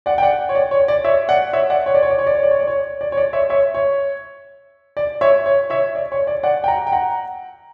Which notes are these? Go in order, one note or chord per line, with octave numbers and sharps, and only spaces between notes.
D5 F#5
G5
D5 F#5
C#5
D5
C#5
D5
C#5 E5
D5 F#5
C#5 E5
D5 F#5
C#5
D5
C#5
D5
C#5
D5
C#5
D5
C#5
D5
C#5
D5
C#5
D5
C#5 E5
C#5 E5
C#5
D5
C#5 E5
C#5
C#5 E5
D5
C#5
D5
D5 F#5
G5
F#5 A#5
G5
F#5 A#5